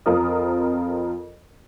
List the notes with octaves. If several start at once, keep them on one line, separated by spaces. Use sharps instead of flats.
F2 C4 F4 A#4 D#6